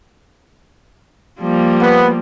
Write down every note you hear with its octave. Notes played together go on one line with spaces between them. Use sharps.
F3 G3 A#3
B3